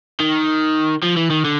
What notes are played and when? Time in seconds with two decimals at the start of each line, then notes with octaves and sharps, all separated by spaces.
0.20 D#3
1.03 F3
1.16 E3
1.30 D#3
1.44 D3